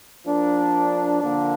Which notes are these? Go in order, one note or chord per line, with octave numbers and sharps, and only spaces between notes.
F3 A#3 D4
D3 F3 A#3 D4